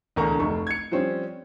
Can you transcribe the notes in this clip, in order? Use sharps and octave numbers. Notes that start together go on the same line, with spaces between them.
E1 D2 A#4 A#5 C#6
F1 A3 C#6
G#6 C#7
F3 G3 C4 C#4